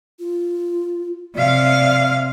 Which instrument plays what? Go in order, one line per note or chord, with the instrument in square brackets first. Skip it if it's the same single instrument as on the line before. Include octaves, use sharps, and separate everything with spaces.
[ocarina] F4
[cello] C3 F5 [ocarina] D5